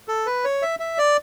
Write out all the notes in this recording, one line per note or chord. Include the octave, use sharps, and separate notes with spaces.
A4
B4
C#5
E5
E5
D5